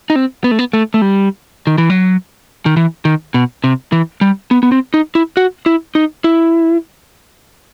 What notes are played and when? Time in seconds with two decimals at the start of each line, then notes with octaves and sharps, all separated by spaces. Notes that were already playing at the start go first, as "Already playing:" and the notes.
0.10 D#4
0.16 C4
0.44 B3
0.51 A3
0.59 B3
0.73 A3
0.94 A3
1.02 G3
1.67 D#3
1.78 E3
1.90 F#3
2.66 D#3
2.77 E3
3.05 D#3
3.34 B2
3.64 C3
3.92 E3
4.21 G3
4.51 B3
4.63 B3
4.72 C4
4.94 D#4
5.15 E4
5.37 F#4
5.66 E4
5.95 D#4
6.24 E4